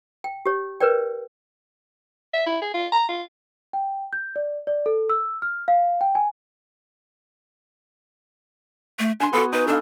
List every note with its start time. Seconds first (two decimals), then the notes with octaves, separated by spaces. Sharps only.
0.24 G5
0.46 G4 C#5
0.80 A#4 B4 C#5 D5 G5
2.33 E5
2.46 E4
2.62 G#4
2.74 F4
2.92 A#5
3.08 F4
3.73 G5
4.13 G6
4.36 D5
4.67 D5
4.86 A4
5.10 E6
5.42 F6
5.68 F5
6.01 G5
6.15 G#5
8.99 A3
9.20 D4 G#5 C6
9.33 B3 F#4 A4
9.53 D#4 B4
9.67 D4 A4 D#5 F5